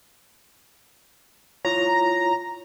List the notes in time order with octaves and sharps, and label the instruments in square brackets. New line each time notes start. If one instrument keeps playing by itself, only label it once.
[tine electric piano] E4 F4 C#5 [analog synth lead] A#5